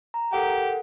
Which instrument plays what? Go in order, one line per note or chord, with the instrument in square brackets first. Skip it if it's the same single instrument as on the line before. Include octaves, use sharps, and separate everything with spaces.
[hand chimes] A#5
[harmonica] G4 [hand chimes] A4 A#4 F#5